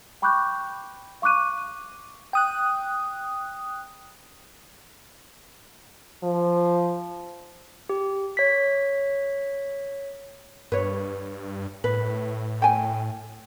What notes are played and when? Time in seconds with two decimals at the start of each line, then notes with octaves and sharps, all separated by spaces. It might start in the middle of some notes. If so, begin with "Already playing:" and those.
0.22 G5 B5 C#6 D6 F#6 G6
1.22 F5 C#6 D6 F#6 D#7
2.33 G5 D#6 F#6
6.23 F3
7.89 G4
8.37 C#5 B6
10.72 G2 B4 C#5
11.84 A2 B4
12.62 G5 G#5